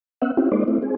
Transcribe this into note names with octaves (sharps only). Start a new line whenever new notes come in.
B3 C#4 E5 F#5
C4 C#4 E4 F4 G4
G#3 A#3 D#4 C5 D5
A3 C4 E4
C4 G#4